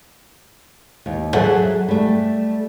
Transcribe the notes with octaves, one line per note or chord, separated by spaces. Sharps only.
D#2
F#3 G#4 A4 E5 F#5
G3 A3